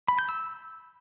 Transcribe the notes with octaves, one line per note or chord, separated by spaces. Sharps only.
B5
G6
E6